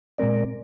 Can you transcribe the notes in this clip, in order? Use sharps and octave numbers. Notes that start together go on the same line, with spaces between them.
A#2 G#3 C4 A#4 D5